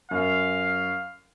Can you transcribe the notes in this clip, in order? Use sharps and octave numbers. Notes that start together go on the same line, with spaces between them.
F#2 F5